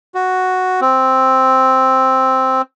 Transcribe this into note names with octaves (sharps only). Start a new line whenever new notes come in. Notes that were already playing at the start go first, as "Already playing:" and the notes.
F#4
C4